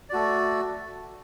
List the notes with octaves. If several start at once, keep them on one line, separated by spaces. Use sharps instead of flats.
A3 F#4 D5